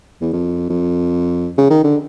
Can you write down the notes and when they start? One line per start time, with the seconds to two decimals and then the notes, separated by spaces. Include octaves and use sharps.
0.22 E2
0.33 F2
0.70 F2
1.58 C#3
1.70 D#3
1.84 D3